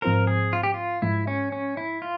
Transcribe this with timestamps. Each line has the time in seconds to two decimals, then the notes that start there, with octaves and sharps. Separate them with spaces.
0.02 G#2 F3 C4 F4 A#4 C5
0.27 G#4
0.53 F4
0.63 G4
0.74 F4
1.02 G#2 F3 G#3 E4
1.27 C#4
1.52 C#4
1.77 E4
2.02 F4